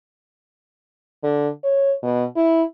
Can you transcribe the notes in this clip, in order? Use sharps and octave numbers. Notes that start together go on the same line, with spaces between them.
D3
C#5
B2
E4